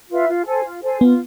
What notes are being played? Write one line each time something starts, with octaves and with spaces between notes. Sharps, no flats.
F4 B4 E5
F4
A4 C5 G#5
F4
A4 C5 G#5
B3 F4